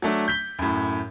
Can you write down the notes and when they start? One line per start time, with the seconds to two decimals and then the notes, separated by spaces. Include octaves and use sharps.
0.02 F#3 A3 D4
0.28 G6 B6 G7
0.59 F#2 A2